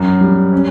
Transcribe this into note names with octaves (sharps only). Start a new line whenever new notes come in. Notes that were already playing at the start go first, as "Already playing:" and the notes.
Already playing: F#2
G3
C#4